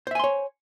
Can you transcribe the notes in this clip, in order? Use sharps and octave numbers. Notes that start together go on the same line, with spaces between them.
C5 C#5 E5 G#5 C6